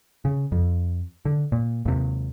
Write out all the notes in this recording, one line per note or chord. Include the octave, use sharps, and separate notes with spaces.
C#3
F2
D3
A#2
D#2 C3